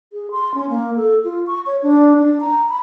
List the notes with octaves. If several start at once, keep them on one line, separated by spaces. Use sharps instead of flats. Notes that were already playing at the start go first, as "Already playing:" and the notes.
G#4
C6
C#4
A#3
A4
F4
C#6
C#5
D4
D4
A#5
B5